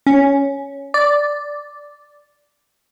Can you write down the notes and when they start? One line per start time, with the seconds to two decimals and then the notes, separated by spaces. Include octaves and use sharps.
0.07 C#4
0.94 D5